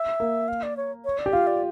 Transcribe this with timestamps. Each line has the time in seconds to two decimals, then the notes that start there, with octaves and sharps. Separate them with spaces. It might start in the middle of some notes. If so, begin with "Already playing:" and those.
Already playing: E5
0.20 A#3
0.48 F5
0.63 D5
0.77 C#5
1.05 C#5
1.19 D5
1.26 G4
1.33 F4 F5
1.47 D5